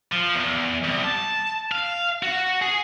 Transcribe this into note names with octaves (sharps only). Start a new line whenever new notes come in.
F3
E2
C2
A5
F5
F#4
G#4